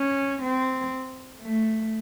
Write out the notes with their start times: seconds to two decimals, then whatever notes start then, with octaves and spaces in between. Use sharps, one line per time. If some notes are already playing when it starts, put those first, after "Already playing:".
Already playing: C#4
0.42 C4
1.41 A3